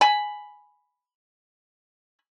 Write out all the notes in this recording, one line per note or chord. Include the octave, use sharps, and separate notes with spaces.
G#5 B5